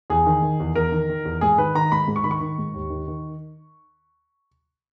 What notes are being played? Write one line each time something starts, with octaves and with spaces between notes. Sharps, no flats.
E2 G#4
D#3
D#3
E2
E2 A#4
D#3
D#3
E2
G#2 G#4
D#3 B4
D#3 A#5
G#2 B5
G#2
C#6
D#3 B5
C#6
D#3
G#2
D#2
D#3
D#3